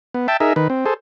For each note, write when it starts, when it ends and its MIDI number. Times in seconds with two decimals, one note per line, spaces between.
0.14 0.27 59
0.28 0.37 76
0.28 0.37 79
0.28 0.37 81
0.40 0.53 63
0.40 0.53 68
0.40 0.53 70
0.40 0.53 76
0.56 0.68 51
0.56 0.68 71
0.70 0.85 60
0.85 0.94 68
0.85 0.94 69
0.85 0.94 72